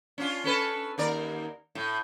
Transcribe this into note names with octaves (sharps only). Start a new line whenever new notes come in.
C#4 D4 F4
C#4 A4 B4
D#2 A#4 D5
A2